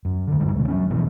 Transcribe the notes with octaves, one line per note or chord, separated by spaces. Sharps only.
F#2
D2 D3
F#1 G2 G3 G#3
D2 B2
F#3 A3 C#4
F#2 B2 E3 F3